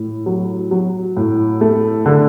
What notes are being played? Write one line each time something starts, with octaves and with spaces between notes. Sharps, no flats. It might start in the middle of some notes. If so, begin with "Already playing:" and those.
Already playing: A2
F#3
F#3
A2
A3
D3